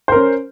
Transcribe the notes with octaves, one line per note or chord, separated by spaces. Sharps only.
C#4 A#4 C5